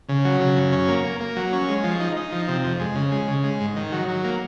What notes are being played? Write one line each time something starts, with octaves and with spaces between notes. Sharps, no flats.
C#3
F#3
C#3
F#2
C#4
A#3
A#3
A#3
F#3
C#4
G#3
F3
D#4
D#4
F3
C3
F2
G#3
C#3
G#3
C#3
G#3
G#2
D#3
F#3
F#3
A#3